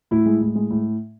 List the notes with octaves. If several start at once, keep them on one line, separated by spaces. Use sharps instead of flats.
A2 E4
G#3
A2
G#3
A2